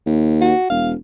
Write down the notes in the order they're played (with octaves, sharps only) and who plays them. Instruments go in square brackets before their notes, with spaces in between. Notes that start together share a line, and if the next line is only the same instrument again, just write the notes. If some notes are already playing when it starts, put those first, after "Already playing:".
[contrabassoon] D#2
[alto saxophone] F#4
[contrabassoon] E1 [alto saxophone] F5